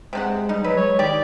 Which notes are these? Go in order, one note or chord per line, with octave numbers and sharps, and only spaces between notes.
C3 G#3 C#4 F#5
G3 D#4
F#3 G#3 B4
C#5
D#3 G4 D5